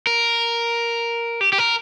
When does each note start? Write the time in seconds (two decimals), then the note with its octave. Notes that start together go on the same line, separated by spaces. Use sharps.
0.07 A#4
1.41 G4
1.53 G4
1.58 A#4